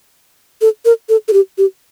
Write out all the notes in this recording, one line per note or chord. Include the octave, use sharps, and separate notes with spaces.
A4
A#4
A4
A4
G4
G4